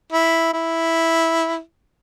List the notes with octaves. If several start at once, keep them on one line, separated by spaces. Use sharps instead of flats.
E4
E4